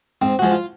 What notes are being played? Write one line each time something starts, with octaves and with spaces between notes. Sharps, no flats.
G#2 C4
F3 G#3 F#4
F4